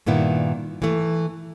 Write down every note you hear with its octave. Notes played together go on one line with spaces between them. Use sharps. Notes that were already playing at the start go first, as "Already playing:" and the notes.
G2 A#2 D#3 B3 E4
E3 A3